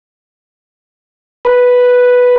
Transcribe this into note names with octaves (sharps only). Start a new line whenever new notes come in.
B4